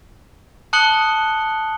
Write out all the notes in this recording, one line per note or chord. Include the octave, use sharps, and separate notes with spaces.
A5 D#6 F#6 C#7 F#7 G7